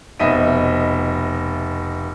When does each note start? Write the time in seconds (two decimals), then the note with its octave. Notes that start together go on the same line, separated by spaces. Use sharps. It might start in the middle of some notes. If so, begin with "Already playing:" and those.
0.20 F1 B2 D#5 E5 D#7